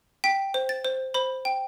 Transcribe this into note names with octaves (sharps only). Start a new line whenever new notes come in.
G5 B6
C5
A6
C5
C5 B5
G5